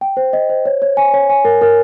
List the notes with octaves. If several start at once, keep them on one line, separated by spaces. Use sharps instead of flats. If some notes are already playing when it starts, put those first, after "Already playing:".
G5
C5
D#5
C5
C#5
C#5
G#5
C#5
G#5
A#4
A#4